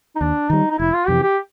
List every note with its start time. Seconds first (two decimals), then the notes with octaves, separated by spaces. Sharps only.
0.16 D#4
0.21 D#2 D4
0.50 D#3 G3 D#4
0.71 D#4
0.79 F1 E4
0.94 F4
1.08 F2 C3 E3 G4
1.23 G4